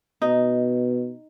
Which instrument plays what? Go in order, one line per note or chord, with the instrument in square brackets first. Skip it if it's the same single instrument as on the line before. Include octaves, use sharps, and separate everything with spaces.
[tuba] B2 [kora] D#4